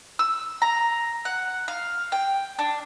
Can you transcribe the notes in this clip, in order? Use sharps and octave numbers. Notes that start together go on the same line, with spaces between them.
E6
A#5
F#5
F5
G5
D4